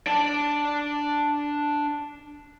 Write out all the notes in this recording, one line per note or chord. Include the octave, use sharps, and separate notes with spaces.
D4 A5